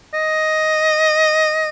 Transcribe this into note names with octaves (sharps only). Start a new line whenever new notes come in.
D#5